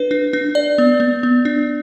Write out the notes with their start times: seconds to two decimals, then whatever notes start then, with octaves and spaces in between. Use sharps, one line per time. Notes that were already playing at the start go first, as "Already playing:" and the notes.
Already playing: D4 B4
0.11 D4
0.33 D4
0.55 D5
0.78 B3
1.00 B3
1.23 B3
1.45 D4